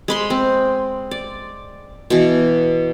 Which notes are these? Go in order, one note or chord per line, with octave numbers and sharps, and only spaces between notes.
G#3 B5 C6
C4
D5
B2 E3